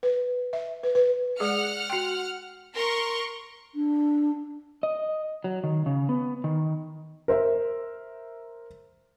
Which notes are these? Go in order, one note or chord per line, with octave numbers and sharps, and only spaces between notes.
B4
E5
B4
B4
G#3 G#4 F#5 F6 C#7
F#4 G5
A#4 C6 C#6
D4
D#5
F#3
D#3
C#3
B3
D#3
A#4 C5 E5